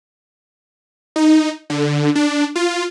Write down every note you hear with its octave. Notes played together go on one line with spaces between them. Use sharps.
D#4
D3
D4
F4